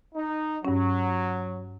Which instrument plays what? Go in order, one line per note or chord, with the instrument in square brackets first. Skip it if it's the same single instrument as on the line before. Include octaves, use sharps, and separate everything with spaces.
[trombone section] D#4
[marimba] G2 C#4 [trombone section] F#3